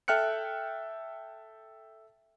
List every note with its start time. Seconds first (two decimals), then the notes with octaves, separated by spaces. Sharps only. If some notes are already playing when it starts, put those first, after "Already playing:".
0.08 A4 E5 G5 F6 F#6 C#7